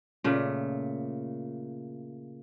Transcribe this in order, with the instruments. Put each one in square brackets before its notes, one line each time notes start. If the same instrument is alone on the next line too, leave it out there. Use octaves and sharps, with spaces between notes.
[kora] A#2 C#3 A3